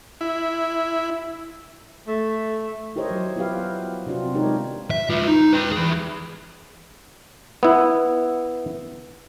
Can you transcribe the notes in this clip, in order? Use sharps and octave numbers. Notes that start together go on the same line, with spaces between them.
E4
A3
E4 G4 A#4 C5 C#5 D#5
F#3
B3 E4 F4 G4 B4 F5
C3 C4 D4 F4 F#4
G#3 D4 D#4 G4 A#4 C#5
E5
F4 B4
D#4
B4 G5
E3 G#4
B3 E4